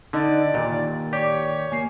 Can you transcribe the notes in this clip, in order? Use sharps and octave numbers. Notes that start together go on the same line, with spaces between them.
D3 D#4 D5
D#2 A#2
G4 C#5 D5 D6
A#3 G#5 C7